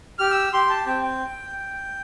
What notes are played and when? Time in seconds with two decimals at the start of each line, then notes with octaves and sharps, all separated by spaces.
0.19 G4 F6
0.31 E6
0.53 G4 C6
0.70 A5
0.86 C4 G5
1.03 G5